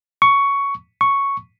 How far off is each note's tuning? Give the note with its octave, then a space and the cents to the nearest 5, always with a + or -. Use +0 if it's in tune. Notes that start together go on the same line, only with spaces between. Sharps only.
C#6 +10
C#6 +0